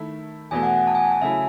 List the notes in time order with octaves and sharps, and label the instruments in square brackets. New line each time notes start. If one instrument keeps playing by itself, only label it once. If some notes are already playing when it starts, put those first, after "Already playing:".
Already playing: [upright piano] D#3 A3 E4
[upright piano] E2 B2 A3 [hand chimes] G#5
[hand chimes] F#5
F#5
A5
G#5
A5
G#5
[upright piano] C#3 F#3 A3 E4 [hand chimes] E5